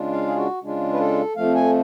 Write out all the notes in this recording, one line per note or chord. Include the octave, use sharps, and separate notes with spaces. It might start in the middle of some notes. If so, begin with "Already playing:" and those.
Already playing: C#3 G#3 D4 F4
F5
G#4
F#4
C#3 G#3 D4 F4
B4
A4
F2 F3 A3 F5
G#5